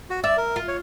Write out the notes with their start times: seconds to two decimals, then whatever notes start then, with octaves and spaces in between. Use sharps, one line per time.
0.10 F#4
0.24 D5 E5
0.37 A#4
0.56 F4
0.68 C#5